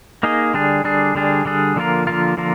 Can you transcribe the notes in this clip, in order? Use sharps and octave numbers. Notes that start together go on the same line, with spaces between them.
A#3 D#4 G#4 D#5
D3 G3 D4 G#4
D3 G3 D4 G#4
D3 G3 D4 G#4
D3 G3 D4 G#4
D3 F3 A#3 F4 A#4
D3 F3 A#3 F4 A#4
D3 F3 A#3 F4 A#4